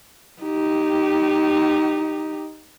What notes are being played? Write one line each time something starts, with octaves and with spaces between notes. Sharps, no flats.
D#4 G4